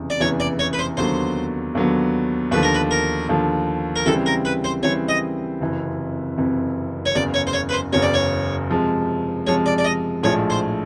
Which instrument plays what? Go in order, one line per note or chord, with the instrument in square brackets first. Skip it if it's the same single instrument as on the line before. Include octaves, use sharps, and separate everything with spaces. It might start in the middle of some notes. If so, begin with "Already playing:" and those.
Already playing: [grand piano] F1 E2 C#3 E3
[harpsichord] D5
[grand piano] F1 E2 C#3 E3 [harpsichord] C#5
[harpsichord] D5
C#5
B4
C5
[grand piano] D#2 D3 F#3 B3 [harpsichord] C5
[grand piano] D#2 D3 F#3 B3
[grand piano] D#2 D3 F3 [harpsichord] B4
[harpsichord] A#4
B4
A#4
[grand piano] D#2 D3 F3
[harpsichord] A#4
[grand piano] C#3 E3 G3 C4 [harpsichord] A4
[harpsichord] A#4
B4
C5
[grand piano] C#3 E3 G3 C4 [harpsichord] C#5
[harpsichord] D#5
[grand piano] F#1 F2 C3 E3
F#1 F2 C3 E3
[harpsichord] C#5
[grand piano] F#1 E2 C#3 [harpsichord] D5
[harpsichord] C#5
C5
C#5
B4
C5
[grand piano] F#1 E2 C#3 [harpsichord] C#5
[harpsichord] D5
C#5
[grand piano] C3 F3 G#3
[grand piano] C3 F3 G#3 [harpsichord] C#5
[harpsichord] D5
D5
D#5
[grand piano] A#1 A2 F3 G#3 [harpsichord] C#5
[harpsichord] C5